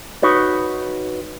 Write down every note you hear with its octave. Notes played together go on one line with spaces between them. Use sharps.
D#4 F#4 B4 C#5